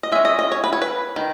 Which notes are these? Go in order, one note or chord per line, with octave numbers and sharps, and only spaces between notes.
D#5
G#3 C#4 E5
D#5
D#5
C#5
B4
C#5
B4
D#3